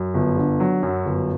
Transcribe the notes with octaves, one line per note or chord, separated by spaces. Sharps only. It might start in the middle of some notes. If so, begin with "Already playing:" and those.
Already playing: F#2
G1
D3
F#3
F#2
G1